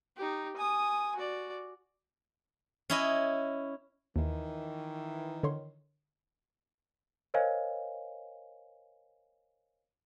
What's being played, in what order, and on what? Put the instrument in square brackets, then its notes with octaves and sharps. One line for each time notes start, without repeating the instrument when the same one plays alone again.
[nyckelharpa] D#4 G4
G#5 D#6
F#4 D5
[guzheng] C#4 E4 D#5
[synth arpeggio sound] D#2 [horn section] D#3 E3
[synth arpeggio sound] D3 C#5 C6
[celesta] A#4 C5 C#5 D#5 F5 G#5